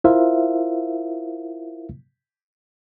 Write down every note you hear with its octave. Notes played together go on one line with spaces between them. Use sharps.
E4 F4 A#4 C5 E5 F5